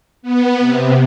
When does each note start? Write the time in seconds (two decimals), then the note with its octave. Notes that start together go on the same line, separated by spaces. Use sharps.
0.22 B3
0.60 C3